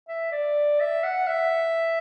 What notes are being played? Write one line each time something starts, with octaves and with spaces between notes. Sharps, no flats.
E5
D5
E5
F#5
E5